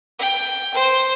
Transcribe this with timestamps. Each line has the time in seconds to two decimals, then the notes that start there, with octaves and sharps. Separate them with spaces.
0.19 G5
0.74 C5